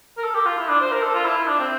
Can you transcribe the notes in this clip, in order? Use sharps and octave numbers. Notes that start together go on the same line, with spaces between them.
A#4
A4
G4
F4
E4
D4
C5
A#4
A4
F4
E4
E4
D4
C4